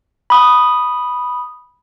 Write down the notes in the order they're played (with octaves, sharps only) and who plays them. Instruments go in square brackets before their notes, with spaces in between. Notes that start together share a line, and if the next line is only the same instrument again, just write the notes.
[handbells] B5 D#6